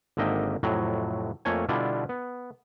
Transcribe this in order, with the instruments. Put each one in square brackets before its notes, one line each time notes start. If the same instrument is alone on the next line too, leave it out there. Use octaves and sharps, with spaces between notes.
[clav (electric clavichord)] G#1 D3 A#3 D#5 E5 G5
F2 A2 C3 F#3
F2 A3 A#3 C#5 G#5
B2 D3 G3 D4 E4 F4
B3